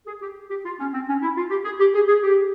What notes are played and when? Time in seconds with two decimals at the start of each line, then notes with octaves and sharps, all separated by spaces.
0.07 G#4
0.22 G4
0.50 G4
0.65 F4
0.80 C#4
0.94 C4
1.08 C#4
1.22 E4
1.37 F4
1.50 G4
1.65 G#4
1.79 G4
1.94 G#4
2.08 G#4
2.23 G4